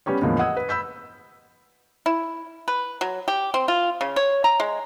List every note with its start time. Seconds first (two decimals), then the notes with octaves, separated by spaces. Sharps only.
0.06 G3 B3 C#4 G4 C#5
0.22 E2 A2 D3 F3 G#3 A#3
0.39 D#5 F#5 D#6 E6 G#6
0.57 B4
0.69 B5 E6 G6 B6
2.06 E4
2.68 B4
3.01 F#3
3.28 G4
3.54 C4
3.68 F4
4.01 C#3
4.16 C#5
4.44 A#5
4.60 G#3